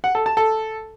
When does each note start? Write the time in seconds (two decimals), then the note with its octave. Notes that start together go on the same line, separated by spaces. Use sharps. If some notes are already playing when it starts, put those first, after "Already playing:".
0.04 F#5
0.15 A4
0.26 A5
0.37 A4